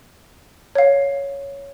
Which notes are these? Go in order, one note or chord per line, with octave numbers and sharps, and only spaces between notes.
C#5 F5